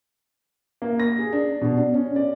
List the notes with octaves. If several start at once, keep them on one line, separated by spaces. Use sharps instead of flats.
A#3
A#6
G#4
D4
B2
D4
C#4
D5